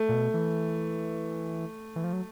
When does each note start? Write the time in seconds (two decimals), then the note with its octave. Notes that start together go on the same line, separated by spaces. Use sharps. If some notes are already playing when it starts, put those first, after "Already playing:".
Already playing: A3
0.09 A#2
0.13 B2
0.34 E3
1.96 E3
2.04 F3
2.13 F#3